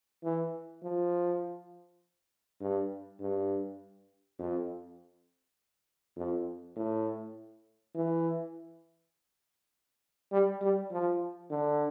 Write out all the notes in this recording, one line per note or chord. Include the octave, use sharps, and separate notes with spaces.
E3
F3
G2
G2
F2
F2
A2
E3
G3
G3
F3
D3